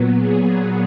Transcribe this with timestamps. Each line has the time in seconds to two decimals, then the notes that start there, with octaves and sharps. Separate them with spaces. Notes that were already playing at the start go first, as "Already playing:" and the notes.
Already playing: A#2 F#3 B3
0.15 G#4